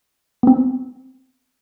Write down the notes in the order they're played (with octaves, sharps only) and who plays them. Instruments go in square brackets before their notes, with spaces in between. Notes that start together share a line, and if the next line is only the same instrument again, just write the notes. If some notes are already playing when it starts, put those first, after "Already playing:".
[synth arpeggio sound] B3 C4